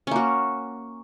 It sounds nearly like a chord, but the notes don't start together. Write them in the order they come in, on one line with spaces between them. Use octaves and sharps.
C#4 A#3 F#4